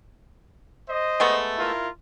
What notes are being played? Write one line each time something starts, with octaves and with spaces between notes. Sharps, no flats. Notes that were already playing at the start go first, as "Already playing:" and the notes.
C5 D#5
G#3 A3 B3
E4 F4 A#4